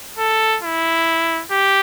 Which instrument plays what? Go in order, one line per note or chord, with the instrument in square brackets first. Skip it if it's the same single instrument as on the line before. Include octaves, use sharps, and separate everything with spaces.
[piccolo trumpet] A4
E4
G4